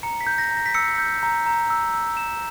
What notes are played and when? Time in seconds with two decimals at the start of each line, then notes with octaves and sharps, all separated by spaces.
0.03 A#5 C#7
0.21 B6
0.27 G6
0.38 A#6
0.51 A#5
0.57 A#6
0.66 B6
0.74 E6 C#7
0.98 G6
1.23 A#5
1.46 A#5
1.70 E6
1.94 E6
2.17 E6 E7